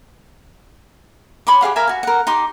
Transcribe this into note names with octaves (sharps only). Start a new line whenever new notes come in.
C#5 B5 C6 D6
G4 G#4 F5 F#5
A#4 E5 F5 G#5
F#4 G#5
A#4 F#5
D#4 G4 C6 D6